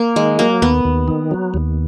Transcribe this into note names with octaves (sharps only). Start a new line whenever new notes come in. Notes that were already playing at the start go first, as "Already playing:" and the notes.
Already playing: A#3
D#3 G#3
F#3 A#3
D#2 B3
D#2
D#3
F#3
D#2